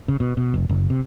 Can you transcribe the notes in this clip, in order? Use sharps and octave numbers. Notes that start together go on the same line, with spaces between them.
C#3
B2
B2
F1
F#1
C3